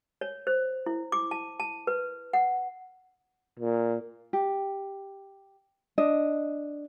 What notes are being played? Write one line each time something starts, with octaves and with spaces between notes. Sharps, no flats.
C#5
C5
E4
D6
A5
A5
B4
F#5
A#2
G4
D4 D#5